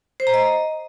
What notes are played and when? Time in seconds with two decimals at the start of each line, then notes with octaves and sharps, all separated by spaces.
0.20 C5
0.27 A#5
0.34 D#5